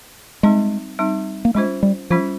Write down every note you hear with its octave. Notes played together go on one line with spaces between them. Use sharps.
G3 G#3 C4 D#4
G3 C4 D#4
A#3
G3 G#3 C#4 F4 C5
G3
F3 G3 C#4 F4 C5